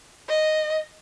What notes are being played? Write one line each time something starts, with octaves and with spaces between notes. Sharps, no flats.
D#5